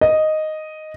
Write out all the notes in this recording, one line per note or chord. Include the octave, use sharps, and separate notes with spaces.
D#5